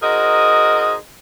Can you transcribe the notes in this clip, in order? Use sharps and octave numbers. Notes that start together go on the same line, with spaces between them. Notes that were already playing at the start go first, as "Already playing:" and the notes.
D#4 F#4 G#4 A#4 C5 D#5